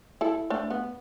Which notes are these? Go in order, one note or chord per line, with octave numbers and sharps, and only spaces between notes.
E4 A4
A3 D4
B3